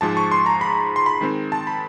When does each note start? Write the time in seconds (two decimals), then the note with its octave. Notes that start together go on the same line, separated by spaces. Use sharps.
0.01 G#2 F3 G#3 A5
0.17 C#6
0.32 C6
0.46 A#5
0.61 B5
0.96 C6
1.06 B5
1.21 D#3 G#3 C4
1.52 A5
1.67 B5